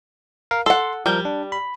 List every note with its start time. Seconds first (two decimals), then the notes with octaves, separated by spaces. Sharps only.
0.51 A#4 F5
0.66 A4 F#5 C6
1.06 F3 G3 A#4 G6
1.25 D4
1.52 B5